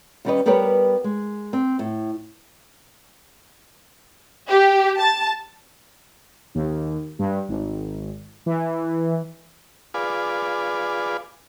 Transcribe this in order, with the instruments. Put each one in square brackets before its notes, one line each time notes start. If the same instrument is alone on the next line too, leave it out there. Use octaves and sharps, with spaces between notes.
[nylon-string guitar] D#2 G3 C#4 G4 B4 D#5
G3 B3 G4 A#4 B4 C#5
G#3
C4
A2
[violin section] G4
A5
[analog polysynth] D#2
G2
G#1
E3
[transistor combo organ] F4 G#4 B4 D5